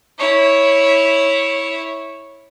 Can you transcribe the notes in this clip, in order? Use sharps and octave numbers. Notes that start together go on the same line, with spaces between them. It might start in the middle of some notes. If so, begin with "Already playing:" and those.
E4 C#5